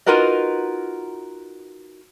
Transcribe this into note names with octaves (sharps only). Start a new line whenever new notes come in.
D#4 F4 F#4 A#4 B4 D#5